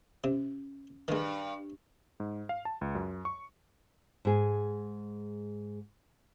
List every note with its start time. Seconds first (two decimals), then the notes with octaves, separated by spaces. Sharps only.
0.24 C3 C#4
1.08 G2 D#3 G#3 B4
2.20 G#2
2.49 F5
2.65 A5
2.81 C#2
2.95 F#2
3.25 C#6
4.25 G#2 G#4